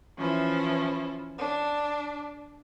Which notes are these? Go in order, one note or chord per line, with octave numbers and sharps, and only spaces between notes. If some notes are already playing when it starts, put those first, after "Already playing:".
E3 F3 C#4 E4
D4